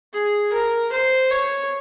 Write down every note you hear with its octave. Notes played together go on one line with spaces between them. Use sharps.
G#4
A#4
C5
C#5